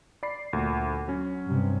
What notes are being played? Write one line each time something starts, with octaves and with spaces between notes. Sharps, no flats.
D5 B5 C7
D2 A#2
F#3 C#4
G2 C3